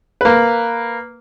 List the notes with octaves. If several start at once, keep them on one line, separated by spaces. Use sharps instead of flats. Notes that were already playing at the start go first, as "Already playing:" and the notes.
A#3 B4